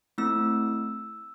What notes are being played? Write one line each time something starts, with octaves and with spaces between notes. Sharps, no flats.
A3 C4 E4 E6